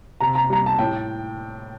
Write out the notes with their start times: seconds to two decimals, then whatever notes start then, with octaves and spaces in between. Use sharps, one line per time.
0.20 C3 A#5
0.35 A#5
0.50 G3 A#5
0.66 A5
0.79 A2 G5